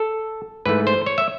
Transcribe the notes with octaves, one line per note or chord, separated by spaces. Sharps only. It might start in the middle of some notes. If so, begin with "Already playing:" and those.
Already playing: A4
G#2 E3 A3 B4
C5
C#5
E5